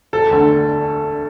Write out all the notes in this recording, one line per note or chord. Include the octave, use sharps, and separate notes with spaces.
E1 A4
D2 D3 A3